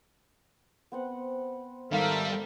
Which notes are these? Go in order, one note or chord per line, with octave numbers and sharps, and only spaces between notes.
B3 C4 F#5
G#1 G3 A4 A#4 E5 F5